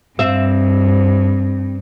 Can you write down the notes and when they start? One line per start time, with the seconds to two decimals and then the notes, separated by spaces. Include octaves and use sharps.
0.19 G2 C4 E5